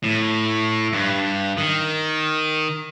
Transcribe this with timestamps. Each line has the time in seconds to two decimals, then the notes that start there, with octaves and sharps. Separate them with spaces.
0.04 A2
0.93 G2
1.57 D#3